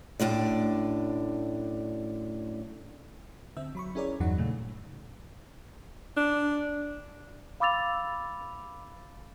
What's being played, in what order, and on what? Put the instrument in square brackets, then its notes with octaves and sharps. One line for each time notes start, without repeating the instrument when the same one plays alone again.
[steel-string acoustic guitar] F#2 A2 D4 D5
[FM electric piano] D3 C4 E5 E6
F#3 B5 C#6
C#4 E4 G#4 A#4 C#5 D5
E2 G2 E3 F#3 D#4 F#5
A#2 C#3 A3
[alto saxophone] D4
[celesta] F5 B5 D6 E6 A6 F7